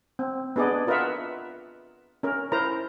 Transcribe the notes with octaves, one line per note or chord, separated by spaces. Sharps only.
C4
B3 D4 G#4 D5 D#5
F4 A#4 B4 D#5 E5 F#5
C#4 A#4
E4 A#4 C5 A#5